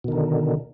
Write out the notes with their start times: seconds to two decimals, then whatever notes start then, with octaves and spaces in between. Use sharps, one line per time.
0.04 B2
0.08 D#3
0.12 D3